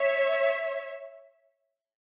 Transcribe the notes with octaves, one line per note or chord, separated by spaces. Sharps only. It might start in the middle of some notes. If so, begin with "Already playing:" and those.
Already playing: C#5 E5